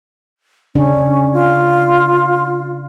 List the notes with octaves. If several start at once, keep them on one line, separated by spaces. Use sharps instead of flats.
C#3 C#4 D4
F4